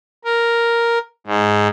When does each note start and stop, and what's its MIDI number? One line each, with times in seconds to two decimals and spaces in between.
0.24 0.98 70
1.27 1.68 44